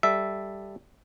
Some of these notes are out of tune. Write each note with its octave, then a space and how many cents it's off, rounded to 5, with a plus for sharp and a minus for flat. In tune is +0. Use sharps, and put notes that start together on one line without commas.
G3 +0 A4 +0 E5 +0